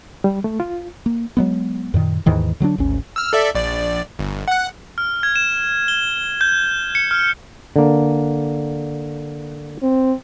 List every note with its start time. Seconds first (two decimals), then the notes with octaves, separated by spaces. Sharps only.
0.24 G3
0.44 A3
0.60 F4
1.06 A#3
1.37 F#3 G#3 B3
1.94 F#2 A#2 D#3
2.26 D#2 G#2 D#3 E3
2.60 D3 F#3 G3 D4
2.78 G#1 D2 C#4
3.16 E6 F6
3.33 A4 D5 E5
3.55 A#1 D5
4.19 G1
4.48 F#5 F#6
4.98 F6
5.23 G#6
5.36 E7
5.88 G7
6.41 G6
6.95 C#7
7.11 F6
7.76 D3 A#3
9.82 C4